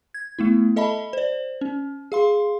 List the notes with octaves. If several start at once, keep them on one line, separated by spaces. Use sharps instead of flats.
G#6
A3 B3 E4
A4 D#5 E5 A5 B5
C5 D5
C#4
G#4 F5 C6